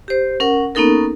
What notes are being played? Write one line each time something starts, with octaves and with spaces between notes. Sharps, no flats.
G4 C5
C#4 A#4 F#5
A#3 B3 C#4 D#4 A4 A#4